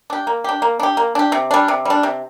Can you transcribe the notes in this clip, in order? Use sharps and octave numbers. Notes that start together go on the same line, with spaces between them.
D4 G4
A#3
D4 G4
A#3
D4 G4
A#3
D4 G4
C3
G3 D4
C3
G3 D4
C3